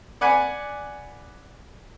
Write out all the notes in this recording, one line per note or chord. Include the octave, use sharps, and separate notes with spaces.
D5 F#5 G#5 B5